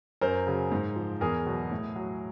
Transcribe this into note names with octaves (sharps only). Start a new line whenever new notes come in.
F#2 A#4 C5
C#3 F#3
G#2
F3
E2 G#4 A#4
B2 F#3
A2
F#3